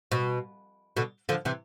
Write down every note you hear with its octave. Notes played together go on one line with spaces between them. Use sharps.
B2
B2 D3
D3 F3
C3 E3